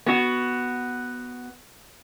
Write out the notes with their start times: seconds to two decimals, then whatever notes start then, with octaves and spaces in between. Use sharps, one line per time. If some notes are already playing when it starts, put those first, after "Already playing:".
0.06 B3 F#4